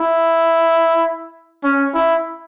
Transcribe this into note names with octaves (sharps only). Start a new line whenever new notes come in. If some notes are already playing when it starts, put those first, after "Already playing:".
Already playing: E4
C#4
E4